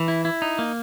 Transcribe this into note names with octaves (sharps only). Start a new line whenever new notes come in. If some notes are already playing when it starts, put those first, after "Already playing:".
Already playing: E3
E4
E4
D#4
A#3